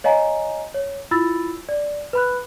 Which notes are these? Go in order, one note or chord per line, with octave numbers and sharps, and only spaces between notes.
C#5 D#5 F5 G#5 A#5
C#5
E4 F4 B5 E6 A6
D5
B4 B5 F#6